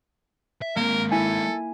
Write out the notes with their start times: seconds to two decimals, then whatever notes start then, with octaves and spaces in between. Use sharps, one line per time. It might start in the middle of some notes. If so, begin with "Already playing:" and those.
0.62 E5
0.76 G#3 A#3 C4 A#4
1.11 E4 A4 G#5